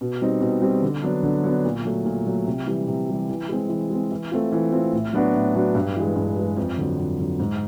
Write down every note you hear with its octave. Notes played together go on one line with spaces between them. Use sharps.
B2
G3 C4 D#4
B2
G3 C4 D#4
D3
F#3 B3 D4
D3
F#3 B3 D4
A#2
F#3 A3
A#2
F#3 A3
C3
E3 G3
C3
E3 G3
E3
G#3 C4
E3
G#3 C4
E3
A3 C4 F4
E3
A3 C4 F4
A2
F#3 B3 D4 F#4
A2
F#3 B3 D4 F#4
G2
E3 G#3
G2
E3 G#3
F2
D3 F#3
F2
D3 F#3
G#2